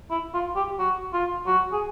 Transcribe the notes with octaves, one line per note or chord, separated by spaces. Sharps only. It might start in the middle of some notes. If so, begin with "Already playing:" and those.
E4
F4
G4
F#4
F4
F#4
G#4